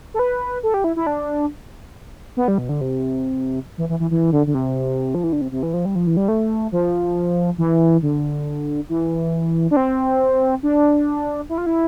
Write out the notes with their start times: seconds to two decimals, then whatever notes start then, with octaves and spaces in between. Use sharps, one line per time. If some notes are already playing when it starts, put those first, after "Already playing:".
0.14 A4
0.19 B4
0.63 A4
0.74 G4
0.84 E4
0.96 E4
1.07 D4
2.37 B3
2.48 G3
2.58 B2
2.69 D3
2.81 C3
3.78 E3
3.89 E3
4.00 E3
4.11 E3
4.32 D3
4.47 D3
4.54 C3
5.15 F3
5.24 E3
5.33 D3
5.41 C3
5.52 C3
5.63 E3
5.74 F3
5.85 G3
5.95 F3
6.07 E3
6.17 G3
6.28 A3
6.72 F3
7.58 E3
8.02 D3
8.89 E3
9.71 D4
9.76 C4
10.63 D4
11.49 E4
11.58 F4
11.66 E4